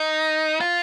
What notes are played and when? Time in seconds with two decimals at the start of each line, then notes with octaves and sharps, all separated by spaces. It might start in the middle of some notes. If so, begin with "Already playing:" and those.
Already playing: D#4
0.61 F4